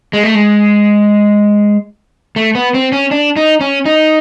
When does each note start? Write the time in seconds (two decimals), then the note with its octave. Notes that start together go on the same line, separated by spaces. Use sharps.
0.13 G#3
0.23 A3
0.35 G#3
2.36 A3
2.55 B3
2.74 C4
2.92 C#4
3.11 D4
3.36 D#4
3.61 C#4
3.86 D#4